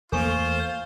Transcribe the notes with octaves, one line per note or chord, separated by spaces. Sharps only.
E2 A3 A#3 F4 A4 C5 G#5 C#6